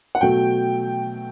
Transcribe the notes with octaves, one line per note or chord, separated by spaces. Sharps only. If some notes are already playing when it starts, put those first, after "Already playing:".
F#5
B2 F#3 A3 G5